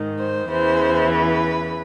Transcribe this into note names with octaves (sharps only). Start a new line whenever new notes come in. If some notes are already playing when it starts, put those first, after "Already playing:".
Already playing: G#2 D#3
C5
E2 C#3 E3 C5
B4